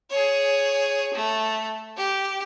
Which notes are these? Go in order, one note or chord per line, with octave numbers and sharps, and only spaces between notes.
G#4 C#5
A3
G4